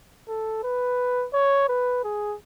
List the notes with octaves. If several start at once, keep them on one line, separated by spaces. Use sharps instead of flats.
A4
B4
C#5
B4
G#4